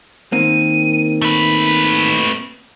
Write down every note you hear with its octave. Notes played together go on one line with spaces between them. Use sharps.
D#3 A#3 C4 D#7
A3 B4 B6